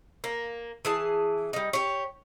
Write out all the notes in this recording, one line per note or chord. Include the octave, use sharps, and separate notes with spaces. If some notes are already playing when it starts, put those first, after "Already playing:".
A#3
E3 G#4 A5
G3 D#4
G4 C#5